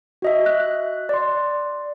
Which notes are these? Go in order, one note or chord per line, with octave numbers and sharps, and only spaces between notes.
F#4 D#5 E5
D#5 F#6
D5 C6